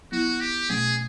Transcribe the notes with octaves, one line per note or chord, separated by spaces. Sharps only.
F#3 B3 E4 F#4
G4
B2 F#3 A3 C#4 G#4